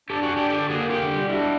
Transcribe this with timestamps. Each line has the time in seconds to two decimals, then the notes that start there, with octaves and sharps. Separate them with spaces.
0.09 D4 G4 A4
0.23 F#4 G#4
0.29 D4
0.37 G4 A4
0.50 D3 G4 A4
0.69 A#3 F#4 G#4
0.90 D3 F4 G4
1.10 G3
1.29 D4 E4 F#4